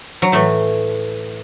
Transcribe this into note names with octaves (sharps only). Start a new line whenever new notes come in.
F#3
A2 E3 A3